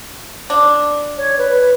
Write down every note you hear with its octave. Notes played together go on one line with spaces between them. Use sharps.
D4
C#5
B4